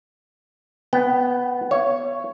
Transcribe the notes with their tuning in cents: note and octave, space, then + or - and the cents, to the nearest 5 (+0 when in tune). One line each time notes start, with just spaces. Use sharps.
B3 +0 G5 -30
C#5 +0 F5 -45